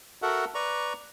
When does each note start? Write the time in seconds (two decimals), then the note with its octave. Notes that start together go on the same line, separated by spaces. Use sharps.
0.22 F#4 A4 A#4 E5 F#5
0.55 B4 D5 A#5 C#6